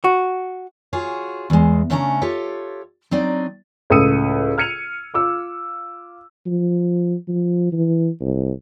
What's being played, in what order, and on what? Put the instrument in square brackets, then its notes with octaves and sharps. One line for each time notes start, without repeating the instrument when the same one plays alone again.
[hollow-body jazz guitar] F#4
[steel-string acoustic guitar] F4 F#4 G#4 C#5
E2 G#3
C#3 A3 C#4 D4 F#5 A#5
F4 G4 A4 C#5
F#3 C4 D4 D#4 D5
[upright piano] C#2 A2 D#6 E6 C#7 D#7
F6 G#6 C#7 D#7 F7
F4 D6 E6
[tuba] F3
F3
E3
C2